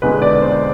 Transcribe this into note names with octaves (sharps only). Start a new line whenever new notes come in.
E2 D3 G#3 B3 B4
D5
C5